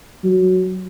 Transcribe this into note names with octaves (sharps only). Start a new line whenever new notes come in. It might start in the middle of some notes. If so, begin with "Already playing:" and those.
F#3